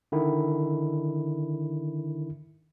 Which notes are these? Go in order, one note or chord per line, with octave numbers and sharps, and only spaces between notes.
D3 D#3 E4